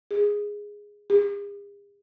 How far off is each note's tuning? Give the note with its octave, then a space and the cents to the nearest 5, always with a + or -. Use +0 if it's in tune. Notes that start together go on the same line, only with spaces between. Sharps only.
G#4 -5
G#4 -45